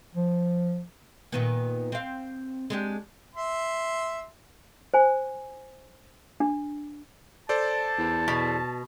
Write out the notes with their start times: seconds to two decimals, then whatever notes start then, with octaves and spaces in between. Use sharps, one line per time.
0.15 F3
1.32 A#2 D#3 B3
1.92 C4 F5
2.70 G#3 D4 G4
3.35 E5 C6
4.94 C5 G#5
6.40 D4
7.49 A4 C5 D5 A5
7.98 E2
8.28 B2